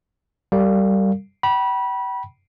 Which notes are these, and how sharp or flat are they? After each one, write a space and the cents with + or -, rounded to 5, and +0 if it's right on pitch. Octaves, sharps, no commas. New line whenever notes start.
G3 -10 A#4 -40 F5 +0
G5 -40 B5 -25